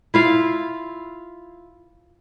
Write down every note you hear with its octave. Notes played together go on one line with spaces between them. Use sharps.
E4 F4 F5